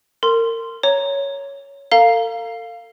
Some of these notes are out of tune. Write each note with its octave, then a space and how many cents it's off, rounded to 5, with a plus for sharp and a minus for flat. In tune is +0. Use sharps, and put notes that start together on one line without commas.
A#4 -30 C6 +0
C#5 +5 A#5 +0
A4 +40 F5 +0 A#5 +0